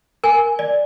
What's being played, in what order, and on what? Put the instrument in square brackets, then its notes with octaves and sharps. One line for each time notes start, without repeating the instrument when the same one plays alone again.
[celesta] A#4 G#5
D5